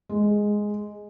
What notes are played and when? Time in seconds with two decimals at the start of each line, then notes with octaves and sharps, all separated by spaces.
0.09 G#3